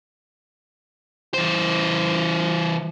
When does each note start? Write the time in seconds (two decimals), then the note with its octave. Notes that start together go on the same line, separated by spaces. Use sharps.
1.34 E3 C5